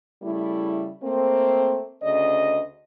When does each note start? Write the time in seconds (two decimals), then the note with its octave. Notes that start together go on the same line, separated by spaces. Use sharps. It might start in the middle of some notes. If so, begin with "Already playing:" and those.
0.23 C#3 G3 A3 E4
1.03 A3 A#3 C4
2.03 D2 C#3 D5 D#5